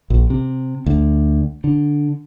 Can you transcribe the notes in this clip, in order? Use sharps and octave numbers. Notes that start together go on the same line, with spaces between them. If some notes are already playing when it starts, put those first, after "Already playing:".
A#1
C3
D2
D3